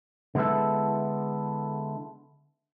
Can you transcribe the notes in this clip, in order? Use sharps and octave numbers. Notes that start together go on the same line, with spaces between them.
D3 G#3 B3 E4 A4